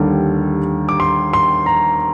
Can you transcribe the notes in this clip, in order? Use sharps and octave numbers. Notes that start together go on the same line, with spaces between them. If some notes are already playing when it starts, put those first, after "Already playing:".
Already playing: D#2 D3 G3
D6
C6
C6
A#5